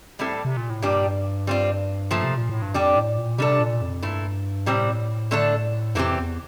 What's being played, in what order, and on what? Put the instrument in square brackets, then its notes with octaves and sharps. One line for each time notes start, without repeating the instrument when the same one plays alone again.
[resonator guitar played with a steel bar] A2 G3 C4 E4 A4
[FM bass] C3
A#2
A2
[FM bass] G2 [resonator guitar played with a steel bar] A#2 G3 D4 G4
[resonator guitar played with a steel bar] G3 C4 F4
A#2 F3 A3
[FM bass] C3
A#2
A2
G2
[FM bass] F2 [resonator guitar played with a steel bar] G3 D4 G4
[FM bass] A2
A#2
[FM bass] C3 [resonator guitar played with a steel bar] G3 D4 A4
[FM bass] A#2
F2
[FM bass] G2 [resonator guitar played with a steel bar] A#2 A3 E4
[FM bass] A2 [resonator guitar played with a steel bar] C3 G3 C4
[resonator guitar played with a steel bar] D3 A3 D4 A4
[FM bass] F2 [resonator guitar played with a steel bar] C3 E3 A3 C4 G4
[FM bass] E2